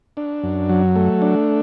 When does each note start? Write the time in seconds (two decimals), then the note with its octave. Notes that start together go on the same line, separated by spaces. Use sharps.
0.17 D4
0.43 F#2
0.70 F#3
0.96 A3
1.22 D4